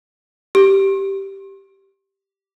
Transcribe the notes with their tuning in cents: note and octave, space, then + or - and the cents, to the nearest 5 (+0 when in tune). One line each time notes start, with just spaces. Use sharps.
G4 -10